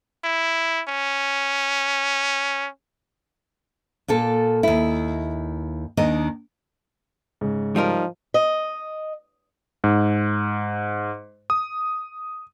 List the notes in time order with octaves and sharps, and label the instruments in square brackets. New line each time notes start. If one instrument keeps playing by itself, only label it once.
[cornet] E4
C#4
[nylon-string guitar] A#2 A#3 A4
D#2 E4
D#2 D#3 D4 D#5
[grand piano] G#2 C#3
[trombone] F3 [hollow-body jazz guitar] G3 D#4 A#4
[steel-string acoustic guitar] D#5
[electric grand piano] G#2
D#6